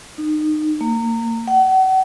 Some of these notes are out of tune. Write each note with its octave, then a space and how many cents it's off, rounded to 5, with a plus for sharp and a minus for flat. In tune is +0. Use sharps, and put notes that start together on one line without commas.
D#4 -25
A#3 -25
F#5 +35